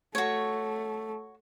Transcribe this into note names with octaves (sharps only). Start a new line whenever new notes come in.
A3 F#4 C#5